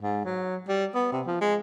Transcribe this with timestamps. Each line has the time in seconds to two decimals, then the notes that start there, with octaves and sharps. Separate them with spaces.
0.01 G#2
0.25 F#3
0.68 G3
0.95 B3
1.12 C3
1.27 F3
1.41 G#3